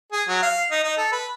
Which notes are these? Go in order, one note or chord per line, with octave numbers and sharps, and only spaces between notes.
G#4
F#3
F5
D#4
D#4
A4
B4